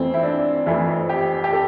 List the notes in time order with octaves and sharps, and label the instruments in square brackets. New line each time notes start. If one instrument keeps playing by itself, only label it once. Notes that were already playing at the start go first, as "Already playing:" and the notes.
Already playing: [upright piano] F2 E3 A3 C4
E4
D4
F2 E3 A3 E4
G4
G4
A4